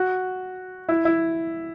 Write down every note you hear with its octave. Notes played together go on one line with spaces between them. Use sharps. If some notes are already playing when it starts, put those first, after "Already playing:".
Already playing: F#4
E4
E4